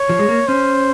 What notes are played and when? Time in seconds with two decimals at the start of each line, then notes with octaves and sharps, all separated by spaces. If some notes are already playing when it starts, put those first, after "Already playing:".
Already playing: C#5
0.09 F3
0.19 G#3
0.29 A#3
0.48 C#4 C5